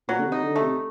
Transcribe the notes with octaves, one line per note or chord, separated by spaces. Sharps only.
A#2 F#3
D3
C3
D#4
D3
A3
C3